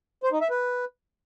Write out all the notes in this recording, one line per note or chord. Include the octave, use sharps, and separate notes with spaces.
C5
D#4
E5
B4